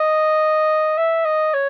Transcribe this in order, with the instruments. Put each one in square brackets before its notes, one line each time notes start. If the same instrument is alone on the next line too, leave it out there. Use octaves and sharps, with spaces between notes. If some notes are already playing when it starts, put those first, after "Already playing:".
Already playing: [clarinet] D#5
E5
D#5
C#5